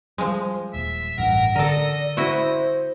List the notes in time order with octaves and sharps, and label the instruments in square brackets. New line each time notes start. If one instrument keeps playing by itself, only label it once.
[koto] F3 G#3 [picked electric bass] G3
[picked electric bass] D#1 [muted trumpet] E5
[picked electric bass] A1 G2 [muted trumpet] A#4 [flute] F#5
[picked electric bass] D3 [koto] A4 A#4 [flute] D5 [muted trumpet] D#5
[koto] E4 F#4 [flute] C5